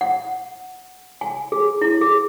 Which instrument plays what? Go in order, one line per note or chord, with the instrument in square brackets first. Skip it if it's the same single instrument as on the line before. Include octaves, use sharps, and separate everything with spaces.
[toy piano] F#5
G#5
G#4
E4
G#4